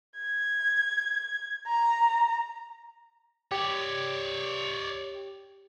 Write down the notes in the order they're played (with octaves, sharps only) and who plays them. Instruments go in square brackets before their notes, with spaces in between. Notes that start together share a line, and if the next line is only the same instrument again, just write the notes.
[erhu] G#6
A#5
[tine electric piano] G4 [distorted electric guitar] C#5 D5